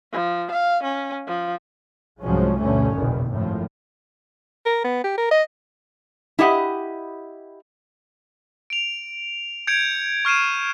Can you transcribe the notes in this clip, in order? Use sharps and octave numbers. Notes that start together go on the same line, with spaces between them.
F3
F5
C#4
F3
C2 G#2 F3 F#3 G#3 C#4
D2 G2 B2 D3 A3 C#4
F#1 B1 E2 A#2 D#3
G#1 F#2 A2 F3
A#4
B3
G4
A#4
D#5
E4 G4 D#5 F#5
D7 F7
G6 G#6 C#7 D7 F7
C#6 F6 C7 D#7 E7